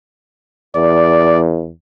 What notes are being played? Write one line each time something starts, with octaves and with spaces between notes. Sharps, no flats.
E2 D5